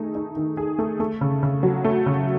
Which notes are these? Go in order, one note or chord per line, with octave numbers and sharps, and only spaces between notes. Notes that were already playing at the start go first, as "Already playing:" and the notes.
Already playing: D#3 A3 D#4 G#4
D#4
D#3
G#4
A3
A3
C#3
C#3
F#3
A3
C#3